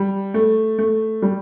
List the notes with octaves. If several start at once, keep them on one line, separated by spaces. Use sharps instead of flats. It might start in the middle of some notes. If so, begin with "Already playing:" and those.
Already playing: G3
A3
A3
G3